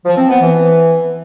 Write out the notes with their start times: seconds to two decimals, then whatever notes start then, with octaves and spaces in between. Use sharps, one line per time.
0.06 F3
0.17 C4
0.29 B3
0.41 E3